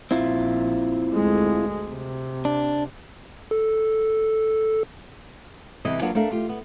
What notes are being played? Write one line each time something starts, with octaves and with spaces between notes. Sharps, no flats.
A#1 C4 E4 F4
D2 G#3
C3
D4
A4
E2 C3 E3 G3 D#5 E5
F#3 A#3 B3 D4 F4 F#4
A3 D4 A#4 F5
F4 G4
B3